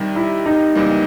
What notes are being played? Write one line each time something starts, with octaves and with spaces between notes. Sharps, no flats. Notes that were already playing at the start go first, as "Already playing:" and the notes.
Already playing: C3 D#3 G3
E4
D#4
C#2 C3 E3 G3 A#3